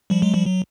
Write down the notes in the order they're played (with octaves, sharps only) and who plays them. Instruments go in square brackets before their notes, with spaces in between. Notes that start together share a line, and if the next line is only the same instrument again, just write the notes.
[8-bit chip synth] F3 G3
F#3 G#3
F3 G3
F#3